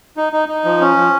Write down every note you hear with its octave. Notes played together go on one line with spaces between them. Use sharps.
D#4
D#4
D#4
F3
C#4
F3